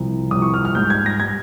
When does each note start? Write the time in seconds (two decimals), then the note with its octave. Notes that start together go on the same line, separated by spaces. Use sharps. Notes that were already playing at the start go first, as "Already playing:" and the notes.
Already playing: C2 C3 F3
0.31 C2 C3 F3 D#6
0.42 C#6
0.54 F6
0.65 F6
0.75 G#2 G3 G6
0.90 G#6
1.06 A#6
1.20 G3 G#6